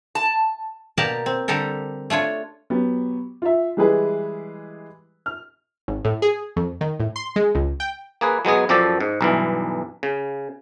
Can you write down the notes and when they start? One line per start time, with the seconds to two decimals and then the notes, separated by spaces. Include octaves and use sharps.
0.15 A5
0.98 B2 A#3 G4 A#4 D5 A5
1.26 C4
1.48 D3 G3 G4 A4 A#4
2.10 A3 D4 F4 C#5
2.70 F#3 B3 G4
3.42 F4 E5
3.77 E3 G3 G#3 E4 G#4 B4
5.26 F6
5.88 G#1
6.05 A2
6.22 G#4
6.56 F2
6.81 D#3
7.00 A2
7.16 C6
7.36 G#3
7.55 C#2
7.80 G5
8.21 A#3 G#4 B4
8.45 F#3 G#3 B3 G#4
8.69 F#2 F3 G4 A4 D5 A5
9.00 G#2
9.21 B1 G2 E3
10.03 C#3